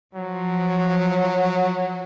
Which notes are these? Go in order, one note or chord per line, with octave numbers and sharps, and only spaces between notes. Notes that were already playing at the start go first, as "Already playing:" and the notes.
F3 F#3